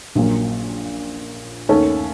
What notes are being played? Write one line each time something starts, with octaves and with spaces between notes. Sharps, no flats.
A#1 A#2 F#3 A#3 C#4
D#2 D#3 A3 C#4 A4